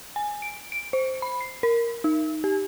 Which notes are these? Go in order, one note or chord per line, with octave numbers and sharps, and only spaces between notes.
G#5
D7
D7
C5
B5
C7
A#4
D#4
G4